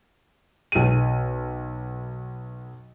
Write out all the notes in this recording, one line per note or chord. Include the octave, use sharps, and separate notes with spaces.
B1 D#7